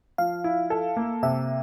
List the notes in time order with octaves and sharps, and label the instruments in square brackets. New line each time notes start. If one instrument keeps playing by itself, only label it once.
[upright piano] F3 [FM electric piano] F5
[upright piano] E4
A4
A#3
[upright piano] C3 [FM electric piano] E5